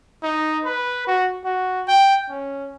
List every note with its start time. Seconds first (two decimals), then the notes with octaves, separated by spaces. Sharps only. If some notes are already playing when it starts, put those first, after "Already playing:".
0.23 D#4
0.65 B4
1.07 F#4
1.45 F#4
1.87 G5
2.30 C#4